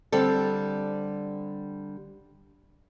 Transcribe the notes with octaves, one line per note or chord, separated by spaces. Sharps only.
D3 G3 C4 G4 A4